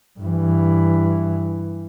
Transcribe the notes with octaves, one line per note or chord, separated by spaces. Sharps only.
G2 E3